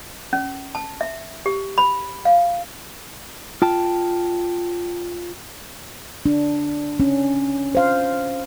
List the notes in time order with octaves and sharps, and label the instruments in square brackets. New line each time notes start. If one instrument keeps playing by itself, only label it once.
[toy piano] C#4
A5
E5
G4
B5
F5
[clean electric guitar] F4 G5 A5
[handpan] D4
C#4
C5 F5